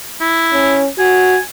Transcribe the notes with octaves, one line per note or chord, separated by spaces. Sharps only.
E4
C#4
F#4 G#5